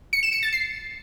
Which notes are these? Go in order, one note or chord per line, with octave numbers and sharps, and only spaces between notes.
C#7
E7
C#7
A6
C7